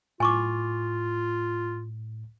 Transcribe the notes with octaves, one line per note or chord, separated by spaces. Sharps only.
A2 F4 G#5 C#6 D6